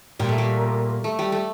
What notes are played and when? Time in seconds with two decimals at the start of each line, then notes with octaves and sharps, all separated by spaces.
0.19 A#2 G3
0.29 A3
0.38 G3
1.04 A3
1.19 G3
1.32 A3